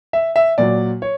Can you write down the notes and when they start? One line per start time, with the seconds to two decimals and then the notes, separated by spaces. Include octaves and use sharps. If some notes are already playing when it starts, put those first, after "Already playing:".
0.13 E5
0.36 E5
0.58 A#2 F#3 D5
1.02 C#5